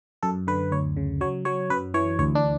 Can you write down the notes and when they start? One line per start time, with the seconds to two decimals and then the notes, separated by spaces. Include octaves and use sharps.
0.23 F#2 A4
0.47 D3 B4
0.72 D2 C#5
0.97 C#3
1.21 F#3 C#5
1.45 F#3 C#5
1.70 F#2 B4
1.94 E3 C#5
2.19 D2 C#5
2.35 D4